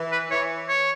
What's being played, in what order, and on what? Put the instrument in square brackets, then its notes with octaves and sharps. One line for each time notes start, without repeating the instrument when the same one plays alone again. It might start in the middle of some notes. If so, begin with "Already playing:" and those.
Already playing: [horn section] E3
[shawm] B4
[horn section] E3 [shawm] C#5
[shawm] C#5